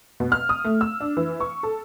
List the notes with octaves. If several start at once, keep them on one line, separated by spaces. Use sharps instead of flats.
B2
F6
D#6
A3
E6
D4
E3
C#6
A4